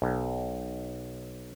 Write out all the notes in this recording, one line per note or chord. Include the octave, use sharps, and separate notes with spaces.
B1